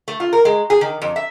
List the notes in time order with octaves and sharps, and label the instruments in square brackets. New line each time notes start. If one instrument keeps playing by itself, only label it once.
[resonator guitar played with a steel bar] A3
F4
A#4
G#3
G#4
D#3
F2
E5